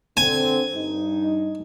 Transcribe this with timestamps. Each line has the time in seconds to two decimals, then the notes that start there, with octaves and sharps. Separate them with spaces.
0.17 D3 C4 G#5
0.75 G2 D#4